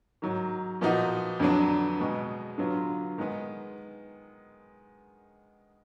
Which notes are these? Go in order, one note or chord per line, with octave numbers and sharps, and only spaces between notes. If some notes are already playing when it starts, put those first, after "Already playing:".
G#2 D#3 F#3
A#2 F3 B3 D#4 F#4
F2 D3 F#3 B3 D4
B2 G#3 B3
D3 F#3 B3 F4
D#3 G#3 B3